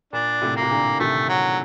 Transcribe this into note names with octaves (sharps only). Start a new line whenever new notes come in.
A#2 D4
A2 C3
A#3
C3
A#2 D3
C3 D#3 A3
F#3